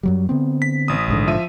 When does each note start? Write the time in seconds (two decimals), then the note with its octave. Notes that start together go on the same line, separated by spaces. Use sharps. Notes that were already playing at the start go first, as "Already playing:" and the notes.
0.03 F#2 F#3 G3
0.29 D3 B3 C4
0.62 B6
0.88 A1 D#6
1.08 A#1 G#2 D3
1.27 F3 E5 D#7